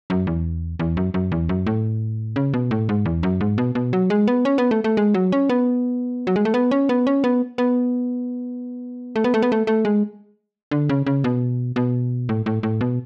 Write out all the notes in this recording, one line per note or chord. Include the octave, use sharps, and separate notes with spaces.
F#2
E2
E2
F#2
F#2
E2
F#2
A2
C#3
B2
A2
G#2
E2
F#2
G#2
B2
B2
F#3
G#3
B3
C#4
B3
A3
A3
G#3
F#3
C#4
B3
F#3
G#3
A3
B3
C#4
B3
C#4
B3
B3
A3
B3
A3
B3
A3
A3
G#3
D3
C#3
C#3
B2
B2
A2
A2
A2
B2